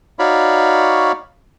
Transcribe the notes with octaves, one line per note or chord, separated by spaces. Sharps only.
D#4 F#4 C#5 D5 F5 B5